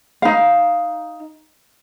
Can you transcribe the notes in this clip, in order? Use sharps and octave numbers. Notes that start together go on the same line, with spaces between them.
D#4 F5